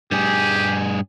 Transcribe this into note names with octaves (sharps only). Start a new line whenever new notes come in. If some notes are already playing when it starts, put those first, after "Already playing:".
G2 G4 G#4